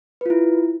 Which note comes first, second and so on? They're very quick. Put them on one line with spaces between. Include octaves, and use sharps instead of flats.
B4 F4 E4